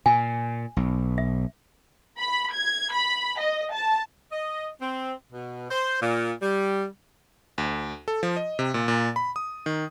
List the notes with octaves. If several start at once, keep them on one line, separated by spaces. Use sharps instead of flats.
A#2 G#5
B1
E5
B5
G#6
B5
D#5
A5
D#5
C4
B2
C5
A#2
G3
D2
A4
F3
D#5
C3
A#2
A#2
B5
D#6
D#3